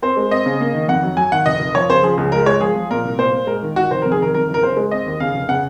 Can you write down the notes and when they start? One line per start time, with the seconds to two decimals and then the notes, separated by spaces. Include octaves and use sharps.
0.02 C4 C5
0.17 G#3
0.31 C4 D#5
0.46 C#3
0.60 A#3
0.74 D#3
0.88 F2 F#5
1.03 F#3
1.17 F#3 G#5
1.32 D#3 F#5
1.46 F1 D#5
1.60 F1
1.75 F3 C#5
1.90 C#3 C5
2.03 F3 G#4
2.18 C#2 G#4
2.32 G#3 A#4
2.46 G#3 C#5
2.61 F3 G#4
2.75 F3
2.91 A#2 A#4
3.05 C2
3.19 A#2 C5
3.33 A#2
3.47 G#3 A#4
3.63 D#3
3.76 D#3 F#4
3.91 F1 C5
4.02 F2 A#4
4.12 G#4
4.20 D#3 A#4
4.34 F2 A#4
4.48 F#1
4.54 A#4
4.62 C#3 C5
4.77 G#3
4.91 C4 D#5
5.06 D#2
5.20 C#3 F5
5.34 F1
5.49 C#3 F#5